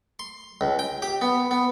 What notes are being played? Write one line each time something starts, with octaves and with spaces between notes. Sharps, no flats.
C6
C#2
G5
G4
B3
B3